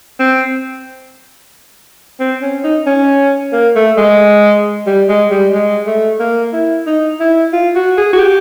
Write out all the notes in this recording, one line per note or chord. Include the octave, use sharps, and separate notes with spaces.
C4
C4
C#4
D#4
C#4
A#3
A3
G#3
G3
G#3
G3
G#3
A3
A#3
E4
D#4
E4
F4
F#4
G#4
F#4
G4